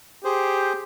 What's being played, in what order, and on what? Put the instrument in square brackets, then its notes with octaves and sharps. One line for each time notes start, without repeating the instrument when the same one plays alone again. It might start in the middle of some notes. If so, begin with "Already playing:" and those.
[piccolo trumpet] G4 [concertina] G#4 C5